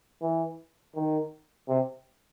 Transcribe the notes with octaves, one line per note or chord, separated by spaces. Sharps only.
E3
D#3
C3